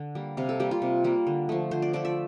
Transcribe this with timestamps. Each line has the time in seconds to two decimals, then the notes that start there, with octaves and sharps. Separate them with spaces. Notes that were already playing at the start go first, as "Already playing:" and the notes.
Already playing: D3
0.15 G3 A#3
0.37 C3 F5
0.49 A4
0.60 G3 A#3 G4
0.71 F4
0.82 C3
1.04 G3 A#3
1.27 D3
1.49 F3 A3
1.71 D3 C5
1.82 D5
1.93 F3 A3 D5
2.05 E5